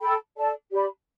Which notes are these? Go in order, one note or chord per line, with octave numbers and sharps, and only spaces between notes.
A4 G5 B5
A4 D5 A5
G4 D5 B5